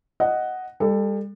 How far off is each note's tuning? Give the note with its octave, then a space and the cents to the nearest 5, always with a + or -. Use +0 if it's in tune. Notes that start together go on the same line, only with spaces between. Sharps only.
D#5 +0 F#5 +5
G3 +40 A4 +10